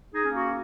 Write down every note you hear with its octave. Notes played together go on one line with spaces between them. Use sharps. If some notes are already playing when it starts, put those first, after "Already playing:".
D#4 G#4
A#3 C#4
F#4